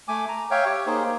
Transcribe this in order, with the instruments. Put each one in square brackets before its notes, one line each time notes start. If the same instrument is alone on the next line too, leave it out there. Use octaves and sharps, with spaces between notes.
[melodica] A3 G#5 D6
A#5
C#5 E5 F5 G5
G4 C#5
A#3 D#4 G#4 C5
A#3